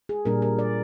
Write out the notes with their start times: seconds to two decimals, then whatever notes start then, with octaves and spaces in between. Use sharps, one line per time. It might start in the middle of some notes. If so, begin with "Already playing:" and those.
0.09 G#4
0.25 A#2 G3 D4 A#4
0.42 A#4
0.59 D5